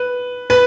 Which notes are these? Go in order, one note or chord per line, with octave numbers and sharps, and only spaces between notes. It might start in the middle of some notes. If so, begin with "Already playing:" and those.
Already playing: B4
B4